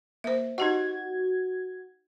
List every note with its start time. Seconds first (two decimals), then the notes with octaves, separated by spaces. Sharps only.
0.24 A#3 C5 E5
0.58 D#4 F#4 G4 D#5 G#6